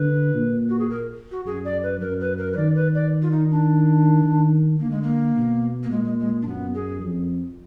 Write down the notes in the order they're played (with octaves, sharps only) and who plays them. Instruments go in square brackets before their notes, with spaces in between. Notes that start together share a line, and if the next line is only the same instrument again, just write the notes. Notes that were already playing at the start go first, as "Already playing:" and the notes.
Already playing: [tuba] D3 [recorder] B4
[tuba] A#2
[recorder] F#4
G#4
A#4
F#4
[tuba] F#2 [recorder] G#4
[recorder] D5
B4
[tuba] F#2 [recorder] A#4
[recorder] B4
A#4
B4
[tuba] D#3 [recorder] D5
[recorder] B4
D5
F4
D#4
D4
[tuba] D#3
[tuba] D3 [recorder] A#3
[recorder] G#3
A#3
[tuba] B2
[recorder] A#3
[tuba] A#2 [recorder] G#3
[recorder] G#3
G#3
D4
[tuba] F#2 [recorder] B3
[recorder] G#4
[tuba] F2